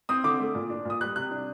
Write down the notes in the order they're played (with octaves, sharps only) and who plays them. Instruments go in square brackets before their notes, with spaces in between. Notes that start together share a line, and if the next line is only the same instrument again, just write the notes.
[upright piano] C4 D#6
D3 D6
A3
A#2
D4
A#2 D#6
G3 F#6
C3 F#6
D4